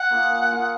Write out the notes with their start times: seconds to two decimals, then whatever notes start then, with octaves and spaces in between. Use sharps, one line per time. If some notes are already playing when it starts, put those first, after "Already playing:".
Already playing: F#5
0.10 A#3 F4 G#4
0.29 D#3
0.49 A#3 F4 G#4